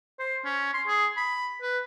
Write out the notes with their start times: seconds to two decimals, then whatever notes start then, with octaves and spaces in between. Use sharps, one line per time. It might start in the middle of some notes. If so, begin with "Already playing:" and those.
0.19 C5
0.45 C#4
0.74 C6
0.87 G#4
1.17 B5
1.62 B4